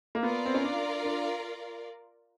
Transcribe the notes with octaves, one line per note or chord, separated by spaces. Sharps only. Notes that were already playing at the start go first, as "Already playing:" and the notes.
A#3
B3 F4 A#4 D5
C4
C#4
D4
D4